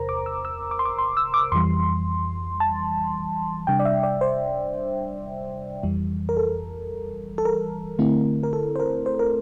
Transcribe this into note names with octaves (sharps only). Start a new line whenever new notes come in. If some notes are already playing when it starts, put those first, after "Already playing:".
Already playing: E2 C3 A#4 C5 A#5
D6
E6
E6
D6
C6
D6
C6
E6
D6
F2 E3 G3 C6
A5
C3 G3 D4 G5
D5
E5
D5
C5
F2 E3 G3
A#4
A4
A4
A#4
D3 A3 C4 E4
A#4
A4
C5
A#4
C5
A#4